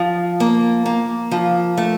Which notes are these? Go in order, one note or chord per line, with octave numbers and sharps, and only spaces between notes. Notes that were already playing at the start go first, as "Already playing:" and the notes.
Already playing: F3
A#3
A#3
F3
A3